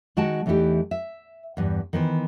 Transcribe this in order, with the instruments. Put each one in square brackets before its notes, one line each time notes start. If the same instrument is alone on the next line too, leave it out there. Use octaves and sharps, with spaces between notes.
[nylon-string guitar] D#3 G#3 F#4 F#5 G5 A5
E2 E3 A3 D#4 E4 G4
E5
E2 G2
D#3 E3 B3 C5